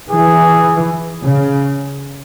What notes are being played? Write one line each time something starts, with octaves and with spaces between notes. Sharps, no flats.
E3 G#4
C#3